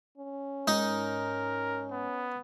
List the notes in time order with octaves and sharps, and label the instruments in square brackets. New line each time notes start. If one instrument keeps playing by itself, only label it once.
[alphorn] C#4
[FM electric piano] G#2 [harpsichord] D#4 [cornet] A#4
[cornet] B3